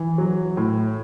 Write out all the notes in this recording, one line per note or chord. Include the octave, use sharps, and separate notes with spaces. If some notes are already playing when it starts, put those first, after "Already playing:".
Already playing: E3
F#3
A2